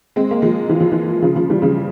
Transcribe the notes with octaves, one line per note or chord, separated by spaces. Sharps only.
G#3 C4
A#3
F3 G#3
E3
F3
E3
C#3 F3
C#3 F3
E3 G3
C#3 F3